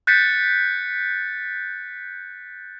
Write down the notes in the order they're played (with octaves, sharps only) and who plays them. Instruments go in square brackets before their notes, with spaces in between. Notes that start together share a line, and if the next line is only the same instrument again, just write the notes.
[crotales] F#6 G6 A6 B6 C#7